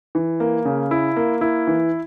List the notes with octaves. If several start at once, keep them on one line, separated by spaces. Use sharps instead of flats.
E3
A#3
C#3
E4
A#3
E4
E3